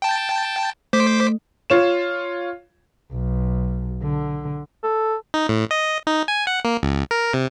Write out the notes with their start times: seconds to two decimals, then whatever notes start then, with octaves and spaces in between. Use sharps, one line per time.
0.02 G5 A5
0.93 A3 C5 D6 B6
1.70 F4 C#5 E7
3.12 B1
4.03 D3
4.84 A4
5.34 D#4
5.49 A2
5.71 D#5
6.07 D#4
6.28 G#5
6.47 F#5
6.65 A#3
6.83 C#2
7.11 A#4
7.33 C3